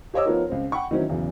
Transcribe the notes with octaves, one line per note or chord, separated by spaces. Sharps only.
G4 C5 C#5 D#5 D6 E6
F3 B3 D#4 F4 A#4 C#5
C#2 C4
F#5 G5 B5 C#6
D#3 E3 F#3 C4 C#4 E4
B1 E2 C#3